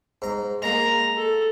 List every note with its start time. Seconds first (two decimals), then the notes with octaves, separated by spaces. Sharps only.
0.22 G#2 A#5
0.62 G#3 A#3 A#5
1.17 A4